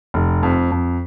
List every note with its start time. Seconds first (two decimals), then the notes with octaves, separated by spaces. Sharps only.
0.14 F1
0.43 F2
0.71 F2